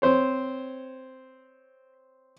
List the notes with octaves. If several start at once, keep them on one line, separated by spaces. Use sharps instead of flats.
C4 C5 C#5